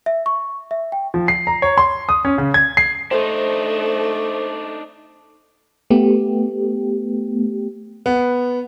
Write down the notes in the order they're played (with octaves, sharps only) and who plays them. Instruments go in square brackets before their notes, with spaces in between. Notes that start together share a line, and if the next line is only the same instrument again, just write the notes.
[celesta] E5
C#6
E5
G5
[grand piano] F3
C7
A#5
C#5
C6
D#6
C#4
C#3
G#6
C7
[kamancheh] A3 [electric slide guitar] D4 D#4 [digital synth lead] C5
[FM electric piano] A3 B3 G4
[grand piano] B3